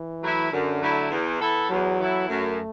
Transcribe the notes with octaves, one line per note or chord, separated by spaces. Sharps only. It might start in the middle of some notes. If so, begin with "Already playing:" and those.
Already playing: E3
F#3 A3 E4
F#2 D3
F#3 A3 E4
E2
E3 B3 E4 A4
E2 F#3
E3 B3 E4 A4
F#2 A3